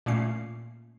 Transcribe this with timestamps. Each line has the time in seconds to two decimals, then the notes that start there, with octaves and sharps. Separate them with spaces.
0.06 A#2 A3 A#3 C#4 C7